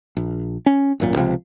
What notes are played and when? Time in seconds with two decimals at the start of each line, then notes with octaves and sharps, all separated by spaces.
0.17 A#1
0.66 C#4
1.00 G#1 F#2 A#2
1.16 C#2 C3 F3